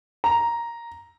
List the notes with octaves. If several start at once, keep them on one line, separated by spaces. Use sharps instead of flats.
A#5